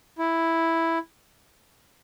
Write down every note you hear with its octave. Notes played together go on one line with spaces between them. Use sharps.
E4